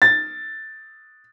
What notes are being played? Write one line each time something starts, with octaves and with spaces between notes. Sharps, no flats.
A6